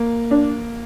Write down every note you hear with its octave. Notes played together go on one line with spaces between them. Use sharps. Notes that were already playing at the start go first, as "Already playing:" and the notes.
Already playing: A#3
D4